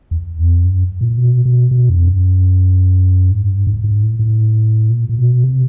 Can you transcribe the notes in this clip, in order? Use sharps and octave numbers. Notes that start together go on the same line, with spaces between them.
E2
F2
F#2
A#2
B2
B2
B2
F2
F#2
G#2
G2
G#2
G#2
A2
A2
A#2
A#2
B2
C3